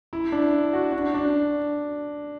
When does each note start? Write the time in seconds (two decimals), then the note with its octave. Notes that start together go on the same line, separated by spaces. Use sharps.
0.13 E4
0.32 D4
0.73 F#4
0.93 D4
1.14 D4